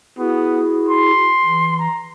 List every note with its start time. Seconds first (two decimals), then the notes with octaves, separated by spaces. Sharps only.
0.18 B3 E4 F#4 G#4
0.89 C6
1.45 E3
1.79 A#5